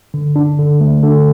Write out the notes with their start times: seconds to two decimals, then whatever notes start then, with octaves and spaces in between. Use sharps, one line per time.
0.14 D3
0.36 D4
0.59 D3
0.81 A3
1.03 D3